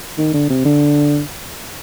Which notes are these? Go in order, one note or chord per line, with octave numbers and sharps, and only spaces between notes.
D#3
D3
C3
D3